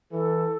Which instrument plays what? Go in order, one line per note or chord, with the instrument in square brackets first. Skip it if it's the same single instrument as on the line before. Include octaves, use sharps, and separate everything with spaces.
[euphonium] E3 [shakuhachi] A4